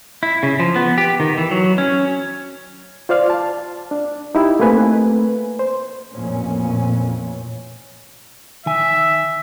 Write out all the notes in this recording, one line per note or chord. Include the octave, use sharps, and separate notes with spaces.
E4
C#3
F3
B3
G4
D#3
E3
F#3
C#4
F4 C5 D5 F5 F6
A5
D4
D#4 E4 G4
A3 A#3 C4 B4 G#5
C5
A1 F2 A#2 C#4
D#3 E5 G#5